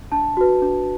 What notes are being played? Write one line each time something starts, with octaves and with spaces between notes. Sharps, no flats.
D4 A5
F#4 B4
D4